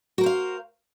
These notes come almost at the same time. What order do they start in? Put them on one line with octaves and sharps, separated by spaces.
F#4 A#4 C5 F5